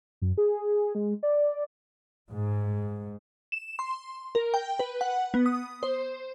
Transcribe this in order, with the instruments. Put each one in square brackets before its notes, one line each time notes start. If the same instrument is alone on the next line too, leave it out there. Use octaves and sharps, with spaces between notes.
[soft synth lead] F#2
G#4
G#3
D5
[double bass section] G#2
[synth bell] E7
C6
A#4
G5
B4
F#5
B3
D#6
C5